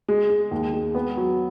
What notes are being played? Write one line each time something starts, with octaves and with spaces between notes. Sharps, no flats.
G#3
G#3
D#2
G#3
B3
F#3